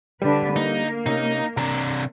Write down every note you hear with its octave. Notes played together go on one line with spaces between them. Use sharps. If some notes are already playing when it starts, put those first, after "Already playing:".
D3 G3 D4 B4
A#3 D#4
C3 C#4 D#4
C3 D4 A#5